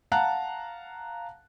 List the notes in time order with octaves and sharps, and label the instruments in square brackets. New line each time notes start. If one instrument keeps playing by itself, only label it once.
[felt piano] F5 F#5 A5 A#5 F#6